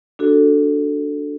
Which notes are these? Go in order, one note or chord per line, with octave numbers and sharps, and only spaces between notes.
D4 F#4 A4